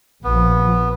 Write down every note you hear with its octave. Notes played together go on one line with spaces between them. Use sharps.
A#1 F3 B3